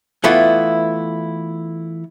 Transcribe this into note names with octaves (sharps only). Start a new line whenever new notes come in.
E3 A3 B3 E4 F4